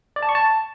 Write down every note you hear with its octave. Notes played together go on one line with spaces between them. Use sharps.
D5
A5
C#6
A5